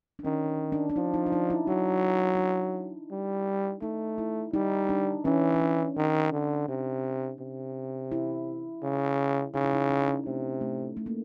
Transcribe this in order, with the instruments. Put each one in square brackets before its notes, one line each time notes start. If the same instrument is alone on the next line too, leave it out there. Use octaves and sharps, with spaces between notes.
[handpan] D4
[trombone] D#3 [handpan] C#4
[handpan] D4
D4
[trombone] F3 [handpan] D#4
[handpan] D#4
D4
D#4
E4
[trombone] F#3 [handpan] D#4
[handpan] D#4
D4
[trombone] G3
[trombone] A3 [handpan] D#4
[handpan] E4
[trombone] G3 [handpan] D#4
[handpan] D4
[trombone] E3 [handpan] C#4
[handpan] C#4
D4
[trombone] D#3 [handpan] C#4
[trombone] D3
[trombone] C3 [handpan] D4
[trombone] C3
[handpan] E4
[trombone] C#3
[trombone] C#3 [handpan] D#4
[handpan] E4
D#4
C#4
D4
C#4
[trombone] C3 [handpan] A3
[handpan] A3
A3
A#3